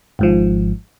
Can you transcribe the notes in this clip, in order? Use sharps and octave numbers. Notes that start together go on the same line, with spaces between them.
G#1 G#2 F3